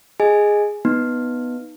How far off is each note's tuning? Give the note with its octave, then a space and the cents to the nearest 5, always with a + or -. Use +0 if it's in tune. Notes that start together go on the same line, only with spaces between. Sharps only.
G#4 +0 D#5 +0 G#5 +0
B3 +0 D#4 +0